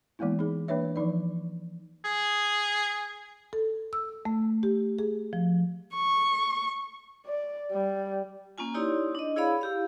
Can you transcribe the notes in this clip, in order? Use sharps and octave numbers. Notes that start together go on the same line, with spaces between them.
E3 G#3 A#3 B3 E4
D#4 G#4
E3 A#3 D4 B4 C#5 E5
E3 F3 D#4 D5
G#4
A4
E6
A3
G4
G#4
F3
C#6
D5
G3
A#3 C#4 F4 G#5
D#4 E4 G4 C#5 D5 C6
D4 D#5
E4 G#4 C#5 D5 F5 B5
E4 G4 F5